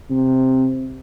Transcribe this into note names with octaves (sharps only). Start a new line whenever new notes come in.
C3